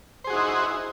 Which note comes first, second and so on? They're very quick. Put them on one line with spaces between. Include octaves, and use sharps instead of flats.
C5 G#4 F#4 D#4 E4